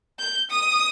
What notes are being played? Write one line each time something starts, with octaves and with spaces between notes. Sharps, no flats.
G6
D#6